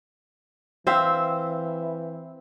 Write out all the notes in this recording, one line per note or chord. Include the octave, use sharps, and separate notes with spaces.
E3 C4 E5 F5